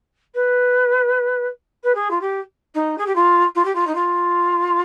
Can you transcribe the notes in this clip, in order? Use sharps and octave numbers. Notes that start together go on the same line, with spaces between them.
B4
B4
G#4
F4
G4
D#4
G#4
G4
F4
F4
G4
F4
D#4
F4